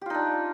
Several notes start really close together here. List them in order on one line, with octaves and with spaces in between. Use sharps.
G4 F4 D#4 D4